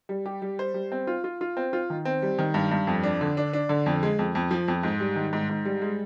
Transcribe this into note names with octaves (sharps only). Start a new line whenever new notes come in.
G3
G4
G3
C5
G3
C4
F4
F4
F4
C4
F4
D#3
C4
G3
D#3
G2
G2
F2
D4
D3
D4
D4
D3
F2
G#3
F2
F2
F3
F2
G#2
G3
D#3
G#2
G#2
G3
G#3